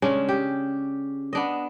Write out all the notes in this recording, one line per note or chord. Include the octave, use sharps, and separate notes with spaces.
C#3 G#3 C#4 D4
G4
B3 D4 D#5